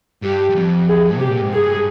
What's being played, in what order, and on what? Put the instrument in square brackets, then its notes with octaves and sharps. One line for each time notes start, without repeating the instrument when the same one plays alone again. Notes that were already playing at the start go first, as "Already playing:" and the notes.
[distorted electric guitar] G2 [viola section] G4
[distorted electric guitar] G2
F2
[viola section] G#4
[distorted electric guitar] C3 [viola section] G4
[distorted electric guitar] A#2
G#2
[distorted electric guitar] G2 [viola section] G#4